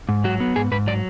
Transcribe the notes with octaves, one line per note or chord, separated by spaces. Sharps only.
G#2
F#3 F#4
B3
G#2 G#4
G#2 B4
F#3 D5